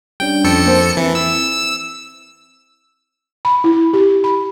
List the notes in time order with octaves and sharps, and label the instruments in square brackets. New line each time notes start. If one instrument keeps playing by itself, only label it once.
[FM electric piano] G3 C#4 D4 [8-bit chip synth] G5
[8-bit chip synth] F2 A4 C#7
[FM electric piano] A#3 C5 A5
[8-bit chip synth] E3 [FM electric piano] C4 E4
[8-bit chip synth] E6
[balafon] B5
E4
G4
B5